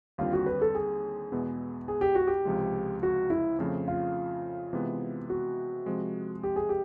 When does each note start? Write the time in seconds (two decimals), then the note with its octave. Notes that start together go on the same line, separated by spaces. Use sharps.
0.18 D#2 D3 G3 C4 F4
0.33 F#4
0.46 B4
0.62 A4
0.75 G#4
1.32 E2 B2 G#3 B3 E4
1.88 G#4
2.01 G4
2.15 F#4
2.27 G4
2.45 C#2 C3 F3 G#3
3.03 F#4
3.30 E4
3.59 F2 C#3 F3 A3 C4
3.88 F4
4.73 C3 E3 G#3 B3
5.30 F#4
5.86 C3 F3 G#3 C4
6.43 G4
6.56 G#4
6.69 G4